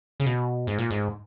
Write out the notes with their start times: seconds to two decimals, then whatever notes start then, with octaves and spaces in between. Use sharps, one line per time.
0.20 C#3
0.26 B2
0.67 G#2
0.78 A#2
0.90 G#2